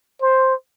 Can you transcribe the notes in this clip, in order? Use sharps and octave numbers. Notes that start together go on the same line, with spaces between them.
C5